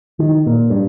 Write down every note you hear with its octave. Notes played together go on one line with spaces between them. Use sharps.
D#3
A#2
G2